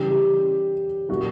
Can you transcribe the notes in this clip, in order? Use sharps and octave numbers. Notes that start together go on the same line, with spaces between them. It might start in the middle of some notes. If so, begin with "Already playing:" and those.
Already playing: C#3 E3 G3 G4
A#2 F#3 F#4